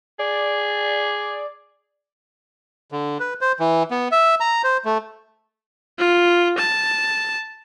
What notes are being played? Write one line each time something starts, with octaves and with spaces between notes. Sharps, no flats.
G#4 D5
D3
B4
C5
E3
B3
E5
A#5
C5
A3
F4
A5